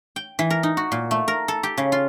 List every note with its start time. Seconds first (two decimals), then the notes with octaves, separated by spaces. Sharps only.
0.16 G5
0.39 E3
0.50 A#4
0.63 D#4
0.77 F#4
0.92 A#2
1.11 A3
1.28 A#4
1.48 A4
1.63 G4
1.77 C#3
1.92 F4